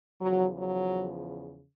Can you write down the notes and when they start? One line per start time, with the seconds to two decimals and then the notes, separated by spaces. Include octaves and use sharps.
0.21 E2 C#3 F3 F#3
0.58 F#3